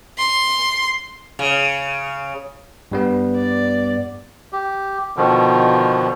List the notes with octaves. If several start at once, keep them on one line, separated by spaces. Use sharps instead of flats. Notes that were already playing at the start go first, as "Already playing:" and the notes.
C6
C#3
G2 G3 B3
D5
G4
B2 D3 D#3 F3